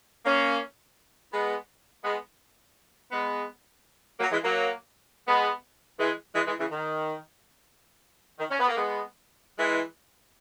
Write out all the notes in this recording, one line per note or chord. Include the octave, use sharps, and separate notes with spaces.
A#3 C#4
G#3 B3
G#3 B3
G#3 B3
F#3 A#3
E3 G#3
F#3 A#3
G#3 B3
E3 G#3
E3 G#3
E3 G#3
C#3 E3
D#3
D#3
C#4
B3
A#3
G#3 B3
E3 G#3